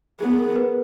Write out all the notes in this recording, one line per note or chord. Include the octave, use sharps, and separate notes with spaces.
B3 G#4
A#4
B4